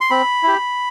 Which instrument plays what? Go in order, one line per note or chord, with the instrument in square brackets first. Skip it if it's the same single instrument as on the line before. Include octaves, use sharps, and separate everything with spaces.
[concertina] C6
C4 B5
E4 G4